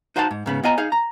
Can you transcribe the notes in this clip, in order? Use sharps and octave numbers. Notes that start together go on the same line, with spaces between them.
D#4 F#4 C5 F5 F#5 A5
G#2
G#2 C#3 B3
B3 F4 D#5 G#5 A#5
D#4 G#4 F5
A#5